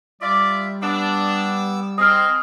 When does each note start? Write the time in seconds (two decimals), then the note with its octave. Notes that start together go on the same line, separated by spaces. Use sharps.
0.21 G3 F4 D5 E5
0.82 B3 D4 D6 E6
1.98 C4 G#4 D#5 D#6 F6